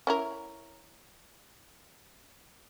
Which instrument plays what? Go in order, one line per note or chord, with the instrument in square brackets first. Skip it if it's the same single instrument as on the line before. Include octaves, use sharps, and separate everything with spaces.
[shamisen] C#4 E4 A#4